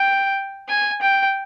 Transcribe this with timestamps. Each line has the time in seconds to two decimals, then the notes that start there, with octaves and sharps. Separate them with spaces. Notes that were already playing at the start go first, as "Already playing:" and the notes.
Already playing: G5
0.69 G#5
1.01 G5